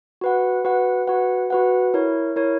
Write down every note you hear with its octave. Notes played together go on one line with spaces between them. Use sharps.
F#4 B4 F#5
F#4 B4 F#5
F#4 B4 F#5
F#4 B4 F#5
E4 A#4 C#5
E4 A#4 C#5